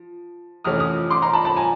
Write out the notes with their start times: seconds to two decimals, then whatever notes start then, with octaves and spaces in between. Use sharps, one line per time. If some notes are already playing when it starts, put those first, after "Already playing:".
Already playing: F3
0.64 F2 C3 E3 A3 C#4 D#6 F6
0.80 D#6 F6
1.10 C6 D6
1.22 A#5 C6
1.33 A5 B5
1.45 A5 B5
1.57 G#5 A#5